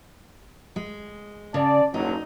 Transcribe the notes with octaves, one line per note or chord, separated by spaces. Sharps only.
G#3
C#3 D5 A5
F#1 B1 F#3 D#4